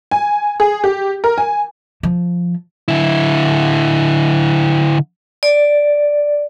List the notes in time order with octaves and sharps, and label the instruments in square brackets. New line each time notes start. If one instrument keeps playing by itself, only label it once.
[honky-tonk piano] G#5
G#4
G4
A#4
G#5
[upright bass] F3
[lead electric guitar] D3 E4
[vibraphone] D5